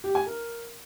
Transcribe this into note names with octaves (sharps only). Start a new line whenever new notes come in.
G4
G#5
A#4